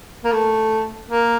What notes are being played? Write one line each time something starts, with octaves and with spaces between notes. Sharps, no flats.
A#3
A3
A#3